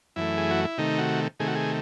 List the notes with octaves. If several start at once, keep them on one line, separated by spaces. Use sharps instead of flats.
F#2 E3 A3 E4
G#4
F#4
E4
C3 D#3 A3 D#4
F#4
C3 D#3 A3 G#4
F#4
G#4